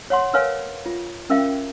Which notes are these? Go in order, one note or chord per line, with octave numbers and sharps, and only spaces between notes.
C#5 F#5 C6
A#4 B4 C#5 F5 G#5
F4
C#4 A#4 E5 F5 G5